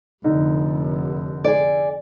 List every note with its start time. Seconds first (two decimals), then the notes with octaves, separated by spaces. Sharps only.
0.24 F1 D3 D#4
1.44 G#4 D5